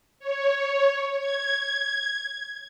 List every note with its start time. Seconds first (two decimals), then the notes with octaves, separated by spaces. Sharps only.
0.19 C#5
1.17 G#6